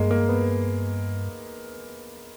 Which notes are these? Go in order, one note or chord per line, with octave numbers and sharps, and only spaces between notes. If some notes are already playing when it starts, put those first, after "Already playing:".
Already playing: G2 G#3 A#3
A#3
B3